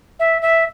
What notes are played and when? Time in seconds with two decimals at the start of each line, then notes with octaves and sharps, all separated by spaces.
0.19 E5
0.42 E5